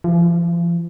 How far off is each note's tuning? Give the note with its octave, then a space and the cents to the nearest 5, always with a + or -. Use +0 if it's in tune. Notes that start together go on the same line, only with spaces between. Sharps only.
F3 -40